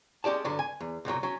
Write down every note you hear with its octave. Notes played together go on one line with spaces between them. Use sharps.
G#3 C#4 G4 D5 A5
G2 D3 F#3
G#5
E2
C2 F#2 A#2 F#3
F#3 C#4